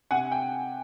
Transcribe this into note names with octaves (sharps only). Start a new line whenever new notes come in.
C3 F#5 G#5
G5